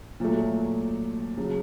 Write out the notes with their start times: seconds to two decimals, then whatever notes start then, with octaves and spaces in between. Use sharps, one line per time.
0.20 A#2 F#3 A3
1.37 C#3 F#3